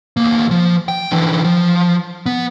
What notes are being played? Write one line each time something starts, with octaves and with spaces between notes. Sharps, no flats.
D2 A#3
F3
G5
D3 E3
F3
B3